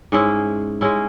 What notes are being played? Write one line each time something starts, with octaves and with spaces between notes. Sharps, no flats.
G#2 G#3 C#4 E4
G#3 C#4 E4